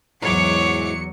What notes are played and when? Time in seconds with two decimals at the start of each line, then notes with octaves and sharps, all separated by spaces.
0.22 E2 G#2 E3 F#3 G#3 C#5 D6 C#7